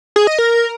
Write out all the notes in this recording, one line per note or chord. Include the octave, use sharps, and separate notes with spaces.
G#4
D#5
A#4